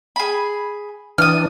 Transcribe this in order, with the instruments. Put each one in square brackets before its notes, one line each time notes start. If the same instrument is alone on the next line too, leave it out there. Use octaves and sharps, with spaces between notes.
[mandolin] G#4 B5
[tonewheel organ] E3 D4 [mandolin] D#6 F6